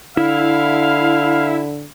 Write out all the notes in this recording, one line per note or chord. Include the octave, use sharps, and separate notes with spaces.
D3 E4 F5